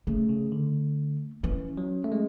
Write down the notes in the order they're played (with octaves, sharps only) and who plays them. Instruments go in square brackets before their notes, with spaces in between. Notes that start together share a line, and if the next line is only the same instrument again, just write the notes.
[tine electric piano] C#3 [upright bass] A3
[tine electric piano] C#3
D3
[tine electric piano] E3 [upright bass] C#4
[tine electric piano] F#3
A3
G#3